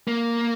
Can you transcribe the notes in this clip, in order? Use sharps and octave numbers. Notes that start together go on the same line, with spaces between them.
A#3